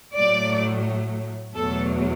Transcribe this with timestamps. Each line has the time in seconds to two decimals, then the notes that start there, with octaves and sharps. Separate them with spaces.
0.16 A2 F#3 A3 D5
1.55 E2 B2 F#3 A3 A4